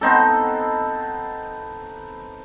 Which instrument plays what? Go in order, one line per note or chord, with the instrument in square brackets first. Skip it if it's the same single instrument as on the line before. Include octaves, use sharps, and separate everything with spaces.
[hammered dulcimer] B3 C4 D#4 A4